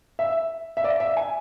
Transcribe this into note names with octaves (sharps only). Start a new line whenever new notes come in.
E5
E5
D5
E5
G#5